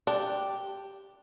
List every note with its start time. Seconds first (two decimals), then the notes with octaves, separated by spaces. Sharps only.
0.07 D4 G4